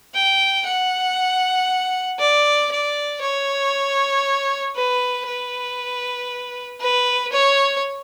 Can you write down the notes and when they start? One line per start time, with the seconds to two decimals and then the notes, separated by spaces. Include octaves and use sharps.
0.15 G5
0.66 F#5
2.20 D5
2.72 D5
3.22 C#5
4.76 B4
5.27 B4
6.80 B4
7.33 C#5